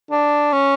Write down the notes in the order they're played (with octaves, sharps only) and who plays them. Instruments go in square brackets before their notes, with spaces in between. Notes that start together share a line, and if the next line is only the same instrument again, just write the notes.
[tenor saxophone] D4
C#4